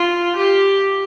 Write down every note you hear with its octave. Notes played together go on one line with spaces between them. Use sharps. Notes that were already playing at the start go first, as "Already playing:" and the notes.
Already playing: F4
G4